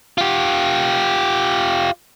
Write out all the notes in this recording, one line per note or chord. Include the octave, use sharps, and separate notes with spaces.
F4 G4